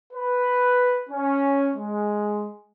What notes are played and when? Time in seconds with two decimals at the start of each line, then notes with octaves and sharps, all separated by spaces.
0.13 B4
1.10 C#4
1.76 G#3